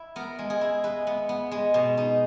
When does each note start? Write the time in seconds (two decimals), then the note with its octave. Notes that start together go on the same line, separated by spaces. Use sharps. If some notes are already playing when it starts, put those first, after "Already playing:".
Already playing: E4
0.16 B3 A#4
0.39 G#3
0.50 G#4
0.61 E4
0.84 G#3 B4
1.07 B3
1.29 B3
1.51 G#3
1.74 B2
1.97 D#4